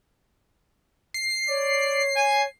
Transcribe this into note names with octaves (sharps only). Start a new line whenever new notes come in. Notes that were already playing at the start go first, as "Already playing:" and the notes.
C7
C#5 D5
G#5